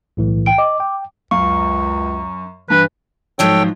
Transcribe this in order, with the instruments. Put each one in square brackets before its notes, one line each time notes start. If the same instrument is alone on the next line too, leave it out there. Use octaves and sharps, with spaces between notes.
[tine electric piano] B1 A2 E3
[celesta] G5 D7
[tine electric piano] D#5 [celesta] D6
[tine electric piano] G5
[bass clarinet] C#2 [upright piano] F#2 F5 [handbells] C#6
[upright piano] G2 [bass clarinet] E3 [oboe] B4
[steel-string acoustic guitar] G#2 F3 F#3 [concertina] A4 C#5 G5